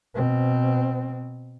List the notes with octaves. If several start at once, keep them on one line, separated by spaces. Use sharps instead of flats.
B2 C4